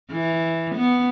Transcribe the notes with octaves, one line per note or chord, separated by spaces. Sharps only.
E3
B3